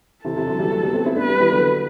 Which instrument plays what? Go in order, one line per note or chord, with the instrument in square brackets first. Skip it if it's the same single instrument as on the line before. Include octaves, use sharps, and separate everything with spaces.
[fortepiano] C3 E3 [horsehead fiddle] A4
[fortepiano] C3 E3
D3 F#3
E3 G3
F#3 A3
G3 B3
A3 C4
C4 E4
[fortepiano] B3 D4 [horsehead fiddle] B4
[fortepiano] G3 B3
E3 G3
D3 F#3